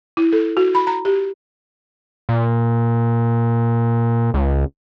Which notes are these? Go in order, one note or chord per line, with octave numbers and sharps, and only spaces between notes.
E4
A4
F#4
B5
A#5
G4
A#2
C#2